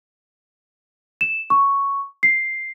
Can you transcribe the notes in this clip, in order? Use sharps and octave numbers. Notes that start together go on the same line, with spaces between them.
E7
C#6
C7